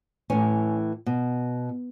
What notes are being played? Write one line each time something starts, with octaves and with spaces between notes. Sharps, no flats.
A2 E3 C#4
B2